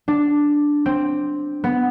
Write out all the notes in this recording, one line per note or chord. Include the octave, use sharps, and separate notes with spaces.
D4
C4
B3